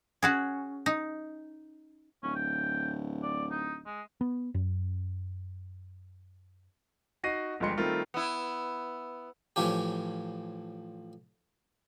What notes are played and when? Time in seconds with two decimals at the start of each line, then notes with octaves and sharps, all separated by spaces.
0.23 C#4 F#4 G#4
0.86 D#4
2.23 D1 C#4
2.35 G5
3.23 D5
3.51 D#4
3.86 G#3
4.21 B3
4.54 F#2
7.23 D#4 F#4 A#6 C7 D#7
7.60 G1 F3 G3 G#3 C6 C#7
7.77 D#3 G3 A3 C4 F4 A#4
8.14 B3 E4
9.56 A2 E3 F3 C#4 G4